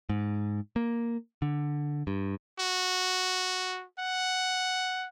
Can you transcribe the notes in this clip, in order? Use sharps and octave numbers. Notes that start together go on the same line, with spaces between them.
G#2
A#3
D3
G2
F#4
F#5